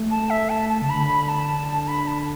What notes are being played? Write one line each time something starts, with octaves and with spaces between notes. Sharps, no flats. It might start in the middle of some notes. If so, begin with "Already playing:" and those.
Already playing: A3
A5
E5
A5
A5
C#3 A5
D3 B5
A5
A5
B5
A5